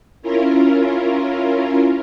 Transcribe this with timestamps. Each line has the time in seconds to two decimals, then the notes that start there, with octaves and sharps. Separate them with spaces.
0.22 C#4 E4 F4 A#4